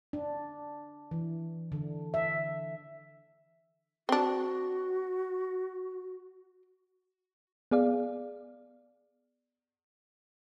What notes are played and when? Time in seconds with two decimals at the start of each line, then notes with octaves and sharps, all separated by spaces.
0.13 D4
1.11 E3
1.72 D3
2.14 E5
4.09 C4 D4 F#4
7.71 B3 G#4 D5 F5